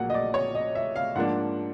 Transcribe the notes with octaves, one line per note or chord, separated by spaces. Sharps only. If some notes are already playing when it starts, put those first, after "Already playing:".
Already playing: A#1 A#2 F#3 A#3 F#5
D#5
D5
C#5
D#5
E5
F5
G#2 F3 A#3 D4 F#5